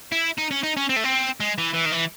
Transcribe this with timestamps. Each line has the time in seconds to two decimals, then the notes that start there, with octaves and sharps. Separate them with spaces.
0.12 E4
0.38 D#4
0.51 C#4
0.63 D#4
0.77 C#4
0.89 C4
0.96 A3
1.04 C4
1.40 G#3
1.58 E3
1.74 E3
1.86 D#3
1.92 E3